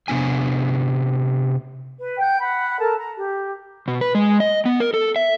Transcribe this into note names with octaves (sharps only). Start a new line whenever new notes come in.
C3 B3 D4 G#5
B4
F#5 G5 G6
F#5 B5
A4 A#4 A5
A#5
G4
B2
B4
G#3
D#5
B3
A#4
A4
E5